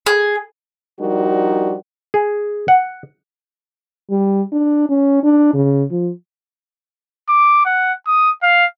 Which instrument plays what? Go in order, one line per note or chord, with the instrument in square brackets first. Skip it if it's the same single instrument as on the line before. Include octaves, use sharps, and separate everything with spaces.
[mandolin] G#4
[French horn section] F3 G3 D4 D#4 F#4 A#4
[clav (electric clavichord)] G#4
F#5
[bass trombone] G3
D4
C#4
D4
C#3
F3
[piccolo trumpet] D6
F#5
D#6
F5